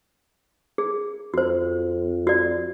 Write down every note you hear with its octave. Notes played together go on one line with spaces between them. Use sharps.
G#4
F2 F#4 C5
F#4 D5